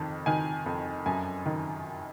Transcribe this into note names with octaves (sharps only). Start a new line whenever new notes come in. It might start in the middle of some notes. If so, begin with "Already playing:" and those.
Already playing: F2 D#3
D#3 G#5
F2
F#2 G#5
D#3